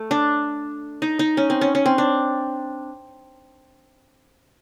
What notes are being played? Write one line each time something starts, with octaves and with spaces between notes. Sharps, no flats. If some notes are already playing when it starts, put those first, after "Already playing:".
Already playing: A3
D4
D#4
D#4
C#4
C4
C#4
C#4
C4
D4